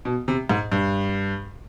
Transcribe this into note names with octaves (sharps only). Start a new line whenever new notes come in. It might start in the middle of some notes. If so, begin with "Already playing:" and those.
B2
C3
G#2
G2